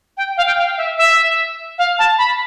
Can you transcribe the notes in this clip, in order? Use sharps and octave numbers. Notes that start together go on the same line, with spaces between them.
G5
F5
G5
F5
E5
E5
F5
A5
B5